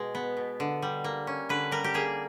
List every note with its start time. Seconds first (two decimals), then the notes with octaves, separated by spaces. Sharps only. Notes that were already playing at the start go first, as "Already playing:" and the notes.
Already playing: B2 G#3
0.15 B3
0.37 B2
0.60 D3
0.82 G3
1.04 A#3
1.27 C#4
1.49 D3 B4
1.71 G3 A#4
1.84 G4
1.94 A#3 G#4